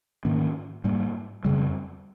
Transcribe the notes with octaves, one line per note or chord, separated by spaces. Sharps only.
G#2 D#3 A#3 C#4
G#2 G3 A#3
F2 C#3 G3